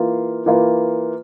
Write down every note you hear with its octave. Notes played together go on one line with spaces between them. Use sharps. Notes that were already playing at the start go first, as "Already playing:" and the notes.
Already playing: E3 A#3 F4
E3 A#3 F4